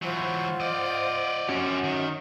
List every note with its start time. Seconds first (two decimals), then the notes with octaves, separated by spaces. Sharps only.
0.02 E3 F#3 F4 C5 F#5
0.60 D5 D#5
1.49 F3 C#4 F#4 G4
1.84 D#3